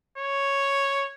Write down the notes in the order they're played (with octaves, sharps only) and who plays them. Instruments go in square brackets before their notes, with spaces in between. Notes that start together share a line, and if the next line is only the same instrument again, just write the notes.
[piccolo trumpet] C#5